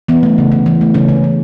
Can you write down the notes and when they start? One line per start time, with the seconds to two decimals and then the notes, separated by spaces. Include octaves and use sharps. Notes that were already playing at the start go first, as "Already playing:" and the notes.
0.09 E3 B3
0.23 A3
0.38 C#3
0.52 C#3
0.66 E3
0.81 A3
0.94 C#3 C#4
1.08 C#3
1.24 E3